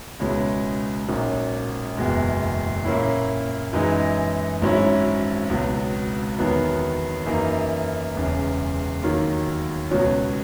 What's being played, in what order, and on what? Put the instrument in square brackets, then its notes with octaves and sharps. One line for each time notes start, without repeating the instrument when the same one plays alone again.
[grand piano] C#2 B2 G#3 C#4 E4
A#1 G#2 F#3 A#3 C#4
F#1 E2 B2 G#3
A#2 A#3 C#4 E4
F#2 E3 G#3 D#4
G#1 G#2 F#3 C#4 E4
C#2 B2 F#3
E2 D#3 F#3 B3
F#2 E3 A#3 D#4
E1 E2 C#3
D#2 D#3 F#3 A#3
C#2 B2 F#3 C#4